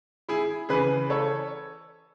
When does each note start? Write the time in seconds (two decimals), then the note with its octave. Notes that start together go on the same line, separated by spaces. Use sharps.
0.29 E4 G#4
0.69 C#3 E3 G#4 B4
1.10 A4 C#5